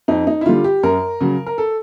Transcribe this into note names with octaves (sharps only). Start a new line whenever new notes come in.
F2 D#4
D#4
E4
D3 G3 F4
G4
F#2 A#4
C#3 F#3
A#4
A4